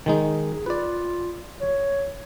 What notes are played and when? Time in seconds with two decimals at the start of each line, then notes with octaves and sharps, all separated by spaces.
0.06 D#3 G#3 D#4 G#4
0.66 F4 B4 D5
1.61 C#5